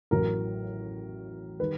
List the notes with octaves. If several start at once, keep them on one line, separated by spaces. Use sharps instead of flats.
A1 A2 F#3 A#4
D#3 G3 B4